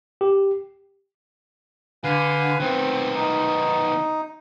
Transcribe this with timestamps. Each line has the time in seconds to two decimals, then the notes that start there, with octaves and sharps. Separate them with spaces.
0.21 G4
2.04 D3 B4 F5 G#5
2.60 D#3 B3 C4
3.15 D#4